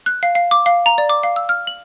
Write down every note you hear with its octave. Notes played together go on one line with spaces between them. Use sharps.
F#6
F5
F5
D6
F5
A#5
D5
D6
F5
E6
F6
F#7